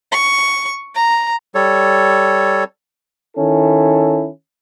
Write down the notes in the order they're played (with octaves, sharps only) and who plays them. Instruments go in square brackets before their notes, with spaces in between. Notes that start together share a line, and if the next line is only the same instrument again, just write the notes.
[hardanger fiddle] C#6
A#5
[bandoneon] G3 A4 C#5
[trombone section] D#3 C#4 E4 A4